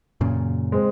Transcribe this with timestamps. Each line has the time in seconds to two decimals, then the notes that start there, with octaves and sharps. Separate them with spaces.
0.21 F#2 A#2 C#3
0.72 G#3 C4